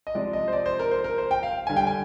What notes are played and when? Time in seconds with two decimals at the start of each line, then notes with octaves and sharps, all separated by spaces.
0.07 D#5
0.15 C3 F3 G#3 D5
0.33 D#5
0.48 C5
0.53 D5
0.66 C5
0.79 A#4
0.91 C5
1.04 A#4
1.18 C5
1.31 G5
1.43 F5
1.67 D3 G3 G#5
1.77 G5
1.87 G#5